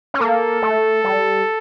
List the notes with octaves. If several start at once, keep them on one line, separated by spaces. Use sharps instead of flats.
C#4
A#3 A4
A3
G3